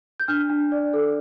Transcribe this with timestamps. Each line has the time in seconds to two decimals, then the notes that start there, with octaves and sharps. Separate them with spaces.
0.20 G6
0.28 D4 F6
0.50 D4
0.72 D5
0.93 A4